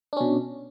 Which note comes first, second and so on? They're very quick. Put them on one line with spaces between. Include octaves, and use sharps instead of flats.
D4 C#4 B2